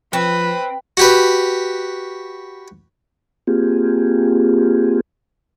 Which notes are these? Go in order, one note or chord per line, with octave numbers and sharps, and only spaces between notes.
F3 C4 B4
F#4 G4 B4
A#3 C4 F4 G4 G#4